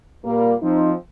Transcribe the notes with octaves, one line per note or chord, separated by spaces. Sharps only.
A#2 G3 A#3
F3 C4 D#4